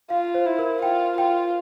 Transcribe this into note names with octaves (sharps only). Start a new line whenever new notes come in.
F4 F5
C5
E4
A#4
F4 G5
F4 G5